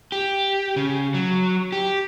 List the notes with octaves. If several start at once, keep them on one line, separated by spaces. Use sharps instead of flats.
G4
C#3
F#3
G4